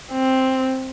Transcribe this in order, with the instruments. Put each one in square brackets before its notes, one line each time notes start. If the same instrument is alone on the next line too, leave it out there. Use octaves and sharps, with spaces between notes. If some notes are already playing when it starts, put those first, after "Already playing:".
[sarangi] C4